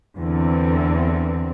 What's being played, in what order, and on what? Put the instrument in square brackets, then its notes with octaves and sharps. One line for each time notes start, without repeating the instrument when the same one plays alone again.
[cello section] E2 D3 C4